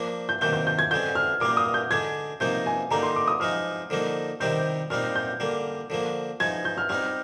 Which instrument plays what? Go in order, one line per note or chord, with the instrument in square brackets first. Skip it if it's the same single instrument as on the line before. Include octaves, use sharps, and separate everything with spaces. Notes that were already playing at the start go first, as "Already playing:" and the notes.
Already playing: [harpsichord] F3 A#3 D4
[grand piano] G6
[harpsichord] C3 D#3 A#3 [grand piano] G6
[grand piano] G6
G6
G#6
[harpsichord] D3 G#3 C4 [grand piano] G6
[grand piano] F6
[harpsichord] A#2 G3 A#3 [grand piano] D6
[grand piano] D#6
G6
[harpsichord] D3 G#3 D4 [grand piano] G#6
[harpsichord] C3 F3 A#3 D#4 [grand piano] G6
[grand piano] G#5
[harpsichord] D3 G3 A#3 D#4 [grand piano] A#5
[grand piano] C6
D6
D#6
[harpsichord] F3 G#3 D#4 [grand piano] F6
[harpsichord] D3 F3 A#3 D#4
[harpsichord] C3 D#3 G3 C4 D#4 [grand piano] G6
[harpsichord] A#2 G3 C4 D#4 [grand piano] F6
[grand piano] G6
[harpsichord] D3 G3 A#3
D3 F3 A#3
[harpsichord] F3 G#3 D#4 [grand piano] G#6
[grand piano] G6
F6
[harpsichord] G3 C4 D#4 [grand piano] F6